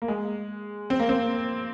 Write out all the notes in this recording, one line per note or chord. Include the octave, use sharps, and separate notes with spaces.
A#3
G#3
C4
A#3
C4